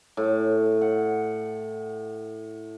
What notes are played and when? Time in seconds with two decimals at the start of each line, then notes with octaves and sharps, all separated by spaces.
0.17 A2
0.81 F#5